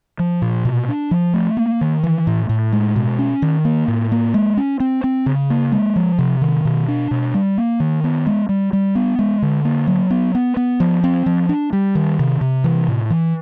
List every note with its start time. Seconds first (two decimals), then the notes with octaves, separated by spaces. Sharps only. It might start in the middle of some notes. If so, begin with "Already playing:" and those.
0.19 F3
0.42 A#2
0.65 B2
0.89 D4
1.11 F3
1.34 A3
1.57 A#3
1.81 D#3
2.03 E3
2.27 A2
2.49 A2
2.72 G#3
2.96 B2
3.19 C#4
3.42 D#3
3.65 A#3
3.88 A2
4.12 A#3
4.34 G#3
4.57 C#4
4.80 C4
5.04 C4
5.26 C#3
5.50 A#3
5.72 G#3
5.96 F3
6.18 C3
6.41 D#3
6.65 B2
6.88 D4
7.11 B2
7.34 G3
7.58 A#3
7.80 D#3
8.04 B3
8.27 G#3
8.49 G3
8.73 G3
8.95 B3
9.19 G#3
9.42 D3
9.65 A#3
9.87 F#3
10.10 B3
10.35 B3
10.57 B3
10.80 F3
11.04 C4
11.26 F3
11.49 D4
11.73 G3
11.95 D#3
12.19 C3
12.41 C3
12.64 E3
12.88 A2
13.10 E3